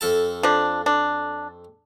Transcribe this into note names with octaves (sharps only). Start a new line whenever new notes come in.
F2 A4 A5
F3 D4
D4